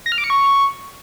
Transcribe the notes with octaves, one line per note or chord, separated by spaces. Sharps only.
A#6
F6
D6
C#7
C#6